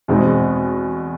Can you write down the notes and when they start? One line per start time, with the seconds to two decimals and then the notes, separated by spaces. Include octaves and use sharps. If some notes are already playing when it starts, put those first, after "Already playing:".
0.08 E2 B2 G#3 C4 D#4